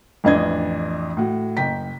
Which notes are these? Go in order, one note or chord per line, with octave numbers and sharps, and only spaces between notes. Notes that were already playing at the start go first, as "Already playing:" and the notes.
A1 F2 E3 D4 D#5 G#6
A2 F#4
F#1 G5 B6